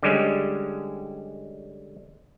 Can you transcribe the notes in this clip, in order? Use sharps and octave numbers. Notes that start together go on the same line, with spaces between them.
D3 G3 G#3 C#4